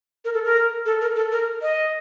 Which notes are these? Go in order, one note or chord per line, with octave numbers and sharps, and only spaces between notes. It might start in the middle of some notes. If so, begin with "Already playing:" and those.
A#4
A4
A#4
A4
A#4
A4
A#4
D#5